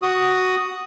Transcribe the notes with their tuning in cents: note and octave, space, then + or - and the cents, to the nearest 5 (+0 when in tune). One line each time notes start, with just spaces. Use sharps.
F#4 +5 D#6 +0